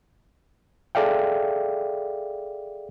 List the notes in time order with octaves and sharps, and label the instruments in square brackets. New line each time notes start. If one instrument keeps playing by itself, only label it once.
[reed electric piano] G#4 A4 D5 E5 F5 G5